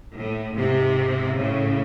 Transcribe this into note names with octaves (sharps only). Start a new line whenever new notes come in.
A2
G#2 C3
A2 C#3